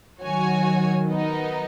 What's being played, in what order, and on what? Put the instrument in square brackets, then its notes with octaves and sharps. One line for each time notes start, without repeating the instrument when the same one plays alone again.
[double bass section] D#3 F#3 [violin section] F#4 C#5 G#5
[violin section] B3 D#4 A#4 D#5